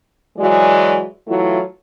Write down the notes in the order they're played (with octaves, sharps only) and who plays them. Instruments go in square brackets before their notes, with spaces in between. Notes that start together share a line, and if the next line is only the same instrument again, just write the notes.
[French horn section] E3 F#3 G#3 F#4 D5
E3 F#3 A3 E4 F4